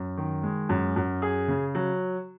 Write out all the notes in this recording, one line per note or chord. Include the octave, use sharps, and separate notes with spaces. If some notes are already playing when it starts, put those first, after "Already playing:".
Already playing: F#2
D#3
G#3
F#2
F#2
G#4
C#3
F#3